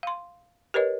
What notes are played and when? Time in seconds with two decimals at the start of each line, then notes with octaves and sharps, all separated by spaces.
0.03 F5 C6
0.74 G4 A#4 B4 C#5 D#5